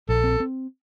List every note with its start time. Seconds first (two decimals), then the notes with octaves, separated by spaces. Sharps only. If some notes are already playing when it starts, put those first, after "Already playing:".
0.09 A#1 A4
0.24 C4
0.40 C4